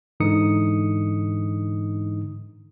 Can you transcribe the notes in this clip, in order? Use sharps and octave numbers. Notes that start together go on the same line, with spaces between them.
G#2 D3 E3 D#4 D#6 C#7